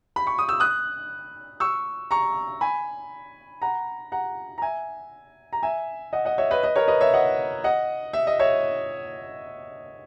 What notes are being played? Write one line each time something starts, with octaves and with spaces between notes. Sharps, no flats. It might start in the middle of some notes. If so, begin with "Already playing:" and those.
B5
C#6
D#6
E6
D#6 F#6
C#6 E6
A#5 C#6
G#5 B5
F#5 A#5
F#5 A#5
A#5
E5 G#5
A#5
E5 G#5
D#5 F#5
D#5 F#5
C#5 E5
B4 D#5
B4 D#5
A#4 C#5
B4 D#5
C#5 E5
D#5 F#5
D#5 F#5
E5
D#5
C#5 E5